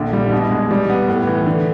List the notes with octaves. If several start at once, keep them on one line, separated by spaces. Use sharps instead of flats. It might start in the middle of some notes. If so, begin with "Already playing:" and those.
Already playing: A#1 D3
G3
B2
G#3
G3
B3
A2
E3
D3